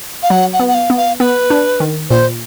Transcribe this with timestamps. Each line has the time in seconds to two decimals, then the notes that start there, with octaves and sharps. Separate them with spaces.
0.23 F5
0.30 F#3 F#5
0.53 F#5
0.60 B3
0.68 F#5
0.75 F5
0.90 B3
0.97 F5
1.20 B3 B4
1.50 D4
1.80 D#3
2.10 A#2 C5